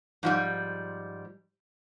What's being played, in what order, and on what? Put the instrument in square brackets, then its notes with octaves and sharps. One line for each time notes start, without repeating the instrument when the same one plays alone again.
[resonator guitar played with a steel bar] G#2 F3 G3